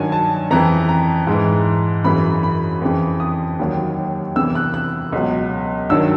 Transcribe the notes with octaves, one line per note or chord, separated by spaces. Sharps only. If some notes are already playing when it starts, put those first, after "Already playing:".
Already playing: G2 D#3 F#3 G#5
A5
F2 C#3 E3 A#5
A#5
G#2 E3
F#2 C#3 E3 B5
B5
F2 C#3 E3
D#6
D#2 D#3 F#3
E2 C3 E3 E6
F#6
F#6
C#2 B2 F#3
G2 D#3 F#3 E6